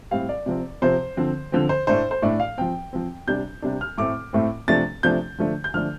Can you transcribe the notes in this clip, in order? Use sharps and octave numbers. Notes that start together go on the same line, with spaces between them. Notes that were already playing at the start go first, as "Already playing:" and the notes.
A2 G3 C4 F5
D5
C3 F3 C4
C3 F3 C4 C5
D3 F3 C4
D3 F3 C4
C5
A2 A3 D4 C5
C5
A2 A3 D4 D5
F5
F3 C4 G5
F3 C4
C3 G3 D4 G6
C3 G3 D4
F6
A2 A3 C4 D6
A2 A3 C4
C3 F3 A3 D4 A6
C3 F3 A3 D4 G6
D3 F3 A3 D4
G6
D3 F3 A3 D4 F6